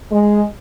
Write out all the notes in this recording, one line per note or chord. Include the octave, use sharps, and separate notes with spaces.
G#3